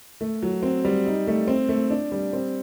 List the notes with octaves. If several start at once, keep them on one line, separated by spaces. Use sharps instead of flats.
A3
F#3
C4
G3
D#4
A3
C4
A3
D4
G3
C4